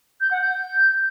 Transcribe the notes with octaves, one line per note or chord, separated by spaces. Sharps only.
G6
F#5
G6